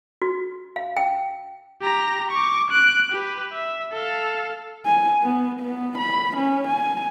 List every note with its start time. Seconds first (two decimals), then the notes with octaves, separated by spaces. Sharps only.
0.22 F#4
0.76 F5
0.97 G5
1.82 G4 A#5
2.31 C#6 D6
2.70 F#6 D7
3.12 G4 B4
3.53 E5
3.93 A4 F5
4.85 G#5
5.23 B3
5.60 B3
5.98 B5
6.37 C#4
6.67 G#5